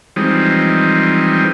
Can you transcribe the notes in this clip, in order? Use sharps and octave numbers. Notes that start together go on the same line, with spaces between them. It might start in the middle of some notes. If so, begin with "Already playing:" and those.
E3 F3 G3 G#3 C4 D#4